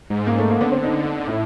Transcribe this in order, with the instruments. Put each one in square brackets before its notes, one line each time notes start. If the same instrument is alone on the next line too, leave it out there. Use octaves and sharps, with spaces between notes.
[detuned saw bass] G#2
[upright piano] A#3
A3
A#3
[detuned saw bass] D3 [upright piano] B3
[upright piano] C4
D#4
[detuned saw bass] A2 [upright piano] E4